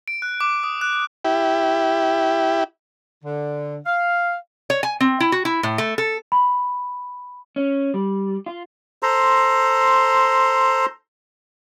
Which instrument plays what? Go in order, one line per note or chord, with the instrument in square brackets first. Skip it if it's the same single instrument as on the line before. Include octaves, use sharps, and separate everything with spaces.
[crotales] D7
F#6
D6
D#6
F#6
[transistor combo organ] E4 G4
[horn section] D3
F5
[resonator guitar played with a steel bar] C#5
G#5
C4
E4
F#4
E4
A2
A3
A4
[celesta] B5
[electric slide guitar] C#4
G3
F4
[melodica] A4 C5 A#5 C6